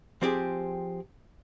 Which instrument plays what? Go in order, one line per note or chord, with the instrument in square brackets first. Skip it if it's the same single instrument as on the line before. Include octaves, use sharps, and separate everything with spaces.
[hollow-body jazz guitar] F3 C4 G4 G#4